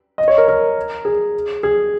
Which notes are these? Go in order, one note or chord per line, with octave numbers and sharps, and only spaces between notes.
D#5
C#5
A#4
A#4
G#4
G#4